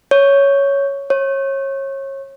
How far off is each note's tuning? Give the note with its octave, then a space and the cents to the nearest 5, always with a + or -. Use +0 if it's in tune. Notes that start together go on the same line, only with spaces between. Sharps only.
C#5 +5
C#5 -30